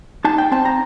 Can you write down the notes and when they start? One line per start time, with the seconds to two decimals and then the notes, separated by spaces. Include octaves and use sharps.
0.24 D#4 A5
0.38 G5
0.52 C4 A5
0.65 A#5